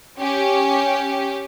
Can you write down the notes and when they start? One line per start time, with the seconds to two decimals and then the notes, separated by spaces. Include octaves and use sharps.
0.19 C#4 G4